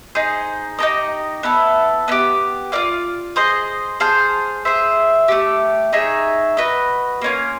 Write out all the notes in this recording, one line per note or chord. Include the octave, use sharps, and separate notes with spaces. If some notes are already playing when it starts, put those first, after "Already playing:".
D#4 G#4 C5
D#4 G4 A#4 D#5
B3 E4 A4
B3 E4 G4
F4 A#4 D5 F5
G#4 C5 D#5
G#4 C5 F5 A5
G#4 C5 E5
A3 D4 G4
D#4 G#4 C#5 E5
F#4 B4 D#5
A#3 C#4 F4